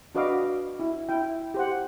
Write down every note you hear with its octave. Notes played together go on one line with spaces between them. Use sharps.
D4 F#4 B4 D#5 F5 D6
E4
E4 G5
G4 C5 F#5